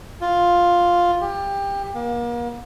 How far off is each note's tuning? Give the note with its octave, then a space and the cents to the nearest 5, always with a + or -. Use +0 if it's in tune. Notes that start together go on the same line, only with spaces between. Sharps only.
F4 +5
G4 +20
A#3 +35